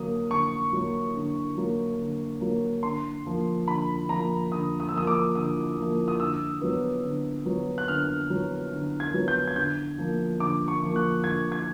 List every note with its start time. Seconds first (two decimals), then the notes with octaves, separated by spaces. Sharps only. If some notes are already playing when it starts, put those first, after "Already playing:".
Already playing: D3 F#3 A#3 D#6
0.31 D3 C#6
0.73 F#3 A#3
1.15 D3
1.57 F#3 A#3
1.99 D3
2.41 F#3 A#3
2.83 D3 C6
3.25 F3 A#3
3.68 D3 B5
4.09 F3 A#3 A#5
4.51 D3 D#6
4.80 D#6
4.89 E6
4.93 F3 A#3 D#6
5.07 D6
5.35 D3 D#6
5.78 F3 A#3
6.08 D#6
6.20 D3 E6
6.62 F#3 B3
7.04 D3
7.46 F#3 B3
7.78 F#6
7.88 D3 F6
8.30 F#3 B3
8.72 D3
9.00 G#6
9.14 F#3 B3
9.28 G6
9.48 G#6
9.56 D3 G6
9.98 F3 A#3
10.40 D3 D6
10.68 C#6
10.83 F3 A#3
10.96 F#6
11.24 D3 G#6
11.52 G#6